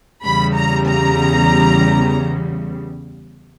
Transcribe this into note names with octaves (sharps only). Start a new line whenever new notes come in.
E2 C#3 G3 B5
A#5
A#5